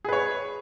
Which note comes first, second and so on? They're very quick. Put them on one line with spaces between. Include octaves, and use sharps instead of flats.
G#4 B4 C#5